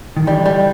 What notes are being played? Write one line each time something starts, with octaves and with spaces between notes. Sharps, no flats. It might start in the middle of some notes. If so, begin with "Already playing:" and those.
D#3
D3 E3 G3
G3